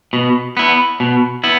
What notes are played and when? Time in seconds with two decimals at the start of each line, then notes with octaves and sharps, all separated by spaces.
0.13 B2
0.57 B3 E4
1.00 B2
1.44 B3 E4